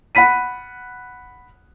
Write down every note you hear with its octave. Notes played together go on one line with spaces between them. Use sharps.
F#5 B5 B6 D#7